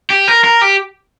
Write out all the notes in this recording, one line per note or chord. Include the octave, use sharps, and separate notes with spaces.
G4
A#4
A#4
G4